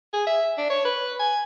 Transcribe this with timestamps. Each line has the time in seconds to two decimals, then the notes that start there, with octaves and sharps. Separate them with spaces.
0.13 G#4
0.27 E5
0.58 D4
0.70 C#5
0.85 B4
1.19 G#5